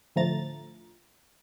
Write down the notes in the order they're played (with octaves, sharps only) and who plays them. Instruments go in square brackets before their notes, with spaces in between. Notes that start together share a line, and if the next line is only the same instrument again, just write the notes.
[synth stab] A2 D3 F3 A3 A#5 A6